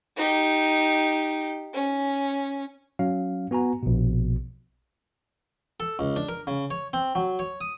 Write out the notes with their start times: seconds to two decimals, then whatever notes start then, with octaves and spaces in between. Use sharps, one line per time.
0.17 D#4 G4
1.73 C#4
2.99 F#3 C#4 F5
3.51 B3 F#4 G#5 A#5
3.83 A#1 B2
5.80 A4
5.99 C#2
6.16 D4
6.29 A#4
6.47 C#3
6.71 C#5
6.93 C4
7.15 F#3
7.39 C#5
7.61 D#6